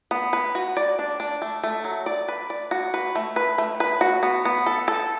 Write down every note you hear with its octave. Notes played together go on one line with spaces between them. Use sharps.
B3
B4
F#4
D5
D4
D4
A3
A3
F#3
D5
B4
D5
F#4
B4
A3
B4
A3
B4
F#4
B3
B3
A4
A4